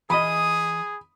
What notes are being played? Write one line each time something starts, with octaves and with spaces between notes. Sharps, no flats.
E3 G#4 D#5 B5 D#6